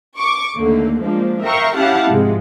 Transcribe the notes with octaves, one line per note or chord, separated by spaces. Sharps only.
C#6 D6
D#2 D3 A3 A#3
F3 G#3 A#3 D4
A#4 E5 F5 G5 A#5 C#6
C#4 E4 G4 F5 F#5 A5
G#2 C3 F3 G#3